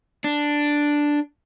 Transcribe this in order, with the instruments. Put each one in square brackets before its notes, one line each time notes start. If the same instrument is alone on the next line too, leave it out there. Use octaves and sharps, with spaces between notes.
[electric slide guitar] D4